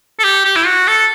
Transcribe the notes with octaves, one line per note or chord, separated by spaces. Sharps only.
A4
G4
G4
E4
F#4
A4